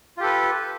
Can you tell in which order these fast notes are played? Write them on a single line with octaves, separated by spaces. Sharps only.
F4 G4 A4 B4